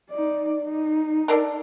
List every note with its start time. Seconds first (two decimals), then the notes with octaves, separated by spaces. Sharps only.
0.11 D#4 D5
0.62 D#4
1.28 D4 A4 A#4